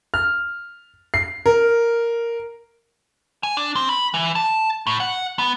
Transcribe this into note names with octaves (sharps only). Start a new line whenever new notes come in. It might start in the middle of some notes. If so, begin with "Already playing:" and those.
F6
C7
A#4
G#5
D4
C4
B5
E3
A5
A2
F#5
B3